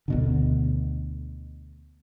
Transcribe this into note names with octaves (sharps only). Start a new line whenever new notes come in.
D2 B2 D3